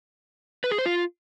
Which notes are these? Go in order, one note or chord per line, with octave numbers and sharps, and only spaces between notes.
B4
G#4
C5
F4